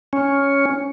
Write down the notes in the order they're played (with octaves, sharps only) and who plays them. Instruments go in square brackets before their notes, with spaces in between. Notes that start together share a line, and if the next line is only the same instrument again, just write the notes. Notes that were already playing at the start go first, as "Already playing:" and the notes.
[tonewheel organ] C#4